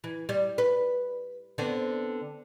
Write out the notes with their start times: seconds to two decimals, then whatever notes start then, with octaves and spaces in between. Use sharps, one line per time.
0.04 E3
0.29 G3
0.58 B4
1.58 D3 B3 C4